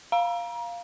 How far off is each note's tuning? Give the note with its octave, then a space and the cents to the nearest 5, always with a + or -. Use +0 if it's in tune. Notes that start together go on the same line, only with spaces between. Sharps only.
F5 +0 A#5 +30